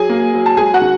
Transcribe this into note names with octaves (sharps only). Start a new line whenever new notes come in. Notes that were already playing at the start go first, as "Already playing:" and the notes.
Already playing: F#3 G#4 G#5
A#3
F#3
A5
G#3 G#4 G#5
F#4 F#5
D#3